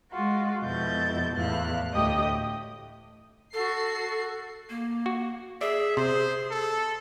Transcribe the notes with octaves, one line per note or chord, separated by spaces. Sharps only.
G#3 F4 F#4
F2 B2 G#3 E4 G6 A6
E2 A2 E4 F5 F#6
D2 A2 G4 D#5 G5 D#6
F#4 A4 C7
A#3
F#4
G#4 D5 E5
C3 C5
A4